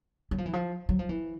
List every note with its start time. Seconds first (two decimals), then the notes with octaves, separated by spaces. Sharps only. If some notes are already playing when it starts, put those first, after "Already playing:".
0.31 F#3
0.38 F3
0.46 E3
0.53 F3
0.89 F#3
0.99 F3
1.09 E3